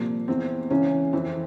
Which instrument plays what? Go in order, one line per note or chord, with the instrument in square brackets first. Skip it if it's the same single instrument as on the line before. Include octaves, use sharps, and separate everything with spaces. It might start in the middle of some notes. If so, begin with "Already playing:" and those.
Already playing: [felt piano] C2 A#2 F3 A#3
E2 E3 C4
C#2 C#3 E3 C#4
F2 E3 C4